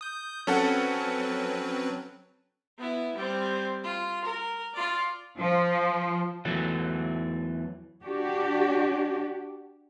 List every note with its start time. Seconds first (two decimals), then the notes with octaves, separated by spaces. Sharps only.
0.01 D#6 G6
0.47 F#3 C4 C#4 A4 B4 F#5
2.79 B3 E4
3.16 G3 C4
3.83 F4
4.24 A#4
4.74 F4 D5
5.38 F3
6.45 E2 E3 F#3 A3
8.05 D4 F#4 G4